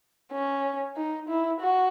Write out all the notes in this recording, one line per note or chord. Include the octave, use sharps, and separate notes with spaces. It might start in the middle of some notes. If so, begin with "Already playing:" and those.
C#4
D#4
E4
F#4